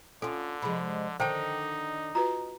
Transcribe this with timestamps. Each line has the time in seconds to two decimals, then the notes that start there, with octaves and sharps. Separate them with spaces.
0.22 D3 C#4 F4 A4
0.62 C3 F3 G#3 B5
1.20 D3 D#3 D#4 C5 G5 A5
2.15 F4 F#4 B4 A#5